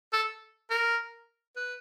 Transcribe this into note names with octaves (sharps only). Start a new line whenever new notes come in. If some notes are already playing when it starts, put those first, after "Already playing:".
A4
A#4
B4